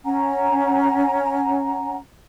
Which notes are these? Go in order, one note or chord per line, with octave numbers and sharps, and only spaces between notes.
C#4 F#5 G#5 A#5